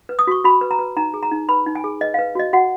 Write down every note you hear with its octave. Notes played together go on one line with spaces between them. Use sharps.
B4
D#6
F#4 C#6
F#4 B5
B4
A#5
B4
D#4 A#5
G#4
A#5
D#4
B4 B5
D#4
G#5
G#4
B4 D#5
F5
B4
F#4 D#5
F#4 F#5